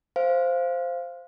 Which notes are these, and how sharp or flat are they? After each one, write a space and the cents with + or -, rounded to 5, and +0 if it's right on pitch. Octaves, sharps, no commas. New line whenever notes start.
C5 +0 F5 -10